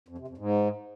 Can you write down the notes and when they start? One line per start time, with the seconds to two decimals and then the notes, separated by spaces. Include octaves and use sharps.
0.08 F2
0.18 C3
0.28 F2
0.37 G#2